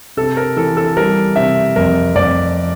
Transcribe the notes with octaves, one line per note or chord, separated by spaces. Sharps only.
C3 A4
A#4
E3 A4
A4
G3 A#4
C3 E5
F2 A#4
F2 D5